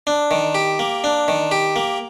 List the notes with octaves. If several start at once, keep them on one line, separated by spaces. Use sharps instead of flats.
D4
D#3
G4
A#3
D4
D#3
G4
A#3